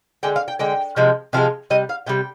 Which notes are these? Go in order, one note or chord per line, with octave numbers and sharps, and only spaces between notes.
D3 G#3 G5
F5
G5
D3 G#3 G5
C3 F3 G#3
C3 F3 G#3 F5
C3 G3 D#5
F5
C3 G3 G5